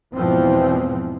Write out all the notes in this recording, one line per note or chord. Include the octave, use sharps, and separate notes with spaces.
E2 G#2 B2 E3 F3 C4